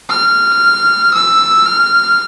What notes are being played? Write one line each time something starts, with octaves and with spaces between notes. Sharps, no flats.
F6
E6
F6